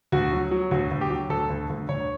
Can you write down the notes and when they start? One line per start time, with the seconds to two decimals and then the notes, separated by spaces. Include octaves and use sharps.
0.12 D2 F#4
0.33 F#3
0.51 F#3
0.71 D2 F#4
0.91 D2
1.01 G4
1.10 F#3
1.29 D2 A4
1.50 D2
1.70 D2
1.89 D2 C#5